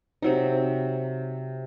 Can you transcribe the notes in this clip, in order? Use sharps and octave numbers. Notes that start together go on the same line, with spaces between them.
C3 F#3 D#4